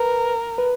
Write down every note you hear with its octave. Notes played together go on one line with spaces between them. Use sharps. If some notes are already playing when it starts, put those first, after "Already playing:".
Already playing: A#4 B4
B4